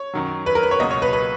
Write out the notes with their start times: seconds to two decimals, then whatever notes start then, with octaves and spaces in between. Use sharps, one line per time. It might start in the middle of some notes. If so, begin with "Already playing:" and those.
Already playing: C#5
0.14 F#2 D#3 F#3
0.46 B4
0.55 A#4
0.63 B4
0.71 C#5
0.80 C#2 B2 F#3 A#3 D#5
0.91 C#5
1.02 B4
1.13 B4